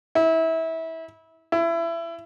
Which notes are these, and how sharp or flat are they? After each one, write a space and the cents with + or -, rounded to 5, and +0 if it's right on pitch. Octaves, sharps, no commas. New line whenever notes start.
E4 -25
E4 +25